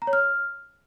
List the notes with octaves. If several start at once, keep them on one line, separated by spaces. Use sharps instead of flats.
A#5
C#5
F6